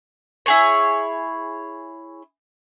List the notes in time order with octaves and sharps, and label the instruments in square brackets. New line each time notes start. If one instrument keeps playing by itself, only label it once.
[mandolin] E4 G#4 C#5